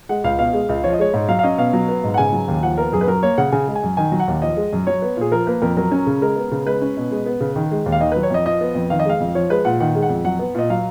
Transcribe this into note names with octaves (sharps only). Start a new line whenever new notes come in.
G#3 F#5
C#2 F5
B2 F5
G#3
C#2
F3 C#5
D#5
G#3 C#5
G#2
F#3 F5
F5
C#4 D#5
B2 F5
F#3
B3
G#2
F#5
C#3 G#5
F#3
D#2
F3 F#5
B3 A#4
F#2 G#4
B4
F#3 A#4
A#3 C#5
C#3 F#5
C#3 G#5
G#3
G#5
F#2
D#3 G#5
F#3
F#5
D#2
F3 D#5
G#3
F#2
F#3 C#5
B3
A#2 G#4
F3 A#4
A#3 B4
F2 A#4
F#3 A#4
C#4
C#3
G#3 A#4
B3
C#3
G#3 B4
C#4
B2
G#3
B3
C#3
D#3
G#3
D#2
F5
D#3 D#5
F#3 B4
C#5
F2 D#5
F3 D#5
B3
F2
D#3 F5
D#5
G#3 F5
F2
F3 C#5
G#3 B4
A#2 F#5
D#3 F#5
G#3
F#5
F2
F#3 F#5
B3
A#2 D#5
F#3 F5